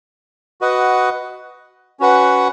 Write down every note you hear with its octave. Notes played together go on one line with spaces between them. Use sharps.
F#4 B4 D#5 F#5
C#4 F#4 B4 F#5